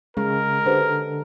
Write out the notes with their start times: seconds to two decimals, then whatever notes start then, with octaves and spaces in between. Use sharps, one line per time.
0.17 C#3 G#3 A#4
0.66 D3 G4 B4 C5